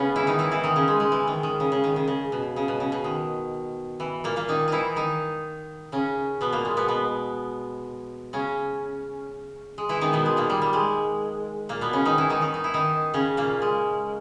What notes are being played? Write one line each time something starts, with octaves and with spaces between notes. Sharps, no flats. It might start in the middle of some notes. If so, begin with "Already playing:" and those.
Already playing: C#3 B3 C#4
E3 E4
D#3 D#4
E3 E4
E3 E4
D#3 D#4
C#3 C#4
G#3
G#3
E3
D#3
D#3
C#3
C#3
D#3
C#3
C#3
B2
C#3
B2
C#3
B2
D#3
E3
A#2 A#3
A#2 A#3
D#3 D#4
E3 D#4 E4
D#3 D#4
C#3 C#4
B2 B3
A#2 A#3
G#3
B2 B3
B2 B3
C#3 C#4
G#3
E3 E4
D#3 D#4
B2 B3
G#3
A#2 A#3
G3
G3
G#3
A#2 A#3
B2 B3
C#3 C#4
D#3 D#4
E3 E4
D#3 D#4
D#3 D#4
D#4
E4
D#3 D#4
C#3 C#4
A#2 A#3
G#3